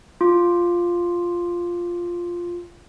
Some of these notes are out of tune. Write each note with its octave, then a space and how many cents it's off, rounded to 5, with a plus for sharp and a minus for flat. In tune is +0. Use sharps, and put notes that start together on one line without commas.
F4 +0 D6 +0